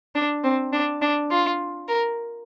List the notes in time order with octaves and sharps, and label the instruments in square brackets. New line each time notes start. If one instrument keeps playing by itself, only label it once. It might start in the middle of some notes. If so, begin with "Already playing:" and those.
[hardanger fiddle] D4
C4
D4
D4
F4
A#4